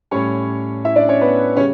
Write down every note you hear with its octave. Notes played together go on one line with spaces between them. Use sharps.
A2 G3 C#4 C#5
E4 E5
D4 D5
C#4 C#5
B3 B4
C#3 G3 C#4 C#5